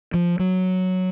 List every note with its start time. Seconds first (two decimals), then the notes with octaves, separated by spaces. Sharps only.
0.14 F3
0.39 F#3